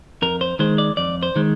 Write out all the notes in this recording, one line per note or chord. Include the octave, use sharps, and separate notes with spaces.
F2 A#4
C5
D#3 G#3 C5
D5
F2 D5
C5
D#3 G#3